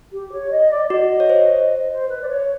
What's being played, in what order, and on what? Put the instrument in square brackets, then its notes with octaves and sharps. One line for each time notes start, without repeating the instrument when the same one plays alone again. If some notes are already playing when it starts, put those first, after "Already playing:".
[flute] G4
C#5
D#5
D5
D5
[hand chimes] F#4 [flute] D#5
[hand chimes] C#5
C5
[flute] C5
B4
D5
C#5